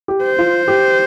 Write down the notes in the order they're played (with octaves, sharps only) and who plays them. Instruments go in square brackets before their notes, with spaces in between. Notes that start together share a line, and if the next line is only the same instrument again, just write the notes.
[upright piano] G4
[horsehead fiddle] C5
[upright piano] F4
G4